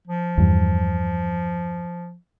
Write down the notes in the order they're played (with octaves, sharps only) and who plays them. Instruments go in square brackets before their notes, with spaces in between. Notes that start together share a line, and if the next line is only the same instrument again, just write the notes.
[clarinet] F3
[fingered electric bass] E2 G2